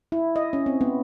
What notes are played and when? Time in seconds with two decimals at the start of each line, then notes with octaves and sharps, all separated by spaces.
0.12 E4
0.36 D#5
0.53 C#4
0.66 C4
0.81 B3